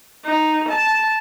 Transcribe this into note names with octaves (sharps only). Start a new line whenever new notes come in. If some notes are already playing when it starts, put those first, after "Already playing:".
D#4
A5